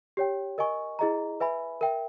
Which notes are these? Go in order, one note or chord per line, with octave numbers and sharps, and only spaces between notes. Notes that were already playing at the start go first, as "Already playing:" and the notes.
G4 C#5 G5
A#4 D#5 G#5 C#6
E4 G#4 D#5 A#5
B4 E5 G#5 B5
A#4 E5 G5